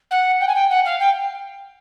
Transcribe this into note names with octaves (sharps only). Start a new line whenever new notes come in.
F#5
G5
G#5
G5
F#5
F5
G5